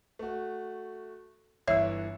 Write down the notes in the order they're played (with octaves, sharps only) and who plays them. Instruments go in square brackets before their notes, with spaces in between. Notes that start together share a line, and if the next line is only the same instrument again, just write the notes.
[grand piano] A3 F#4
[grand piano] G1 E3 E6 [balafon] C#5 E5